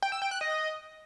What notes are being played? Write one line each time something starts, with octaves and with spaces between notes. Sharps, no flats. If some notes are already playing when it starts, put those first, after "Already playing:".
G5
E6
G5
F#6
D#5